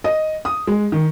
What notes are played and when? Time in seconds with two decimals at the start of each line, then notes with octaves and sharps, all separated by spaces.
0.04 D#5
0.45 D#6
0.67 G#3
0.92 D#3